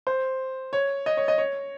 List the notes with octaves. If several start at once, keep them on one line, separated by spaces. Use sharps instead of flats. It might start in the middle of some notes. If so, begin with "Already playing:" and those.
C5
C#5
D#5
C#5
D#5
C#5